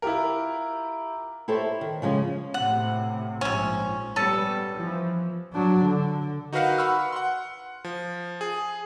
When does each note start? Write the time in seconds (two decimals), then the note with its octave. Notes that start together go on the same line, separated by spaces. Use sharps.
0.02 E4 F4 G4 A#4
1.48 E4 G4 A4 C5 C#5
1.81 D#3
2.02 C#3 F3 G#3 C#4
2.54 A2 C3 F#5
3.41 A#1 G#2 C3 F3 C#4
4.16 G3 B3 C#4 A4
4.74 E3 F3
5.53 F#3 D4
5.85 D3
6.53 D#4 F#4 A#4 B4 F5 F#5
6.78 F#5 B5 C#6 E6 F6
7.12 F#5 C6
7.84 F3
8.41 G#4